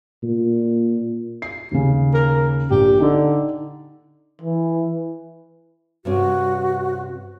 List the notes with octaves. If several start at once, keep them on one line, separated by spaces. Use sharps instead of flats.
A#2
C7
D#2 C#3
A#4
A#1 G4
D3 D#4
E3
G2 C3 C#4 F#4